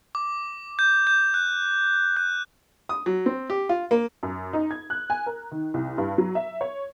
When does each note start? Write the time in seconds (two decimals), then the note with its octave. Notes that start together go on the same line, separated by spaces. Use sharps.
0.15 D6
0.79 G6
1.07 G6
1.34 F#6
2.17 F#6
2.89 D#6
3.06 F#3
3.26 C4
3.50 G4
3.69 F4
3.91 A#3
4.23 F#2
4.53 D#4
4.71 G#6
4.90 F#6
5.10 G#5
5.26 A#4
5.51 D#3
5.74 C2
5.98 G2
6.18 F#3
6.35 E5
6.61 C#5